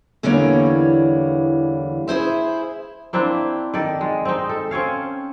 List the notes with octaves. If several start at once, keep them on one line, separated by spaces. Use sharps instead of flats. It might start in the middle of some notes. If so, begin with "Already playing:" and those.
E2 D3 E3 G3 A#3 C#5
E4 G#4 C5 E5
A#3 C4 D4 E4
D#3 A4 D5
G#3
C4 D#4
A4
C4 C#4 C#5 F5